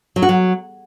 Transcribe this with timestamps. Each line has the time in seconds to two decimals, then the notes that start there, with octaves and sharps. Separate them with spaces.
0.16 F#3
0.22 F#4
0.29 F#3